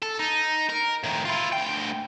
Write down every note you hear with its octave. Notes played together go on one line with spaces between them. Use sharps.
A4
D#4
A#4
A2 D#3
E4 F4
D2 G5